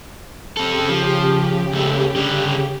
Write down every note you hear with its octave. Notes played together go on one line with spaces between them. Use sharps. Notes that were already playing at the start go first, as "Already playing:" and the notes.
C#3 C4 G4 A4
F3
C#2 A3
D3 G3